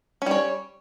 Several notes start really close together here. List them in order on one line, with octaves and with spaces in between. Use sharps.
C#4 G3 C#5